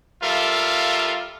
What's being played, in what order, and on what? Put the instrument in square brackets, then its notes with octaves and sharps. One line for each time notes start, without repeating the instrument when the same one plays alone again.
[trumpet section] G3 F4 A4 A#4 E5 F5